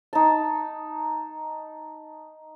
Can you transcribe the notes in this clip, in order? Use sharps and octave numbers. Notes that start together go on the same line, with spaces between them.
D#4 A5